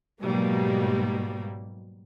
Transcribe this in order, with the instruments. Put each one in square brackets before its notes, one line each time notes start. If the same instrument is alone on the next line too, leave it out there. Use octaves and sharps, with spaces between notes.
[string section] G#2 B2 F#3 G3 A#3